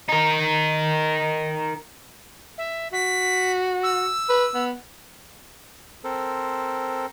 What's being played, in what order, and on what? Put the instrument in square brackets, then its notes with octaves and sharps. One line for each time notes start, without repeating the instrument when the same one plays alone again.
[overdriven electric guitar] D#4 A#4
[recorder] E5
[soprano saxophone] F#4 [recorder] B6
[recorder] E6
[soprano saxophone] B4
B3
[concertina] C4 A4 A#4 C5